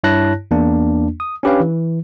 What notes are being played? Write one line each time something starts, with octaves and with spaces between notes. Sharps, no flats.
G2 E4 C#5 A5 F#6 A#6
E2 A#3 D4
D#6
C#4 D4 G4 B4 C#5 F5
E3